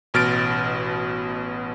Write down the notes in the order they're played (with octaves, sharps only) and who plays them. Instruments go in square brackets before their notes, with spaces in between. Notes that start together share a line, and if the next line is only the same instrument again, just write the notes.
[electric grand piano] A1 B2 F6 A6 D7